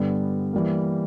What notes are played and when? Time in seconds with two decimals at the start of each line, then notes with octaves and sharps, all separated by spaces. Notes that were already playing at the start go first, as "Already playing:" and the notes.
Already playing: G2 D3 G3 B3
0.53 E3 G3 A#3